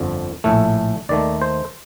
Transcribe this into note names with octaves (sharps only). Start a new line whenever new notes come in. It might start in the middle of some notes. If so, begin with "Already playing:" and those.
Already playing: G1 F2 D3 F3
A#1 A2 A3
D#2 D#3 A3 D5
C5